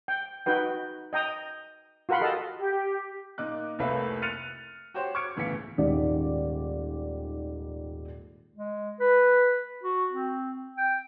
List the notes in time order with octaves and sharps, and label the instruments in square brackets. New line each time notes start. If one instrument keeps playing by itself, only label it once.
[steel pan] G5
D#4 F#4 B4 G5
D#5 G5 A#5 D#6
F4 F#4 A#4 F#5 B5 C6
G4 A4 D#5 F5 A5
[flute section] G4
[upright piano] A#2 D#4 D6 F#6
F1 C2 A3 A#3 B4 E5
F6 F#6 A6 C#7 D#7 F7
F#4 G4 C5 C#5 C6
C#6 D6 F6 G#6 C#7 D7
G1 C#2 A2 E3 B6 C#7
[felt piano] D#1 G#2 D#3 D5
[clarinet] G#3
B4
F#4
C4
G5